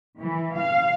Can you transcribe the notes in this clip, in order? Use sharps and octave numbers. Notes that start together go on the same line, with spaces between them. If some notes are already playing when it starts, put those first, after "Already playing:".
E3
F5